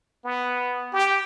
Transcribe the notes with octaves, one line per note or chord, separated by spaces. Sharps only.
B3
G4